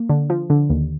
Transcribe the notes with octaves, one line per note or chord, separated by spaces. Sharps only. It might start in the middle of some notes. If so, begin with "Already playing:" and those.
Already playing: A#3
D3
F3
D3
D#2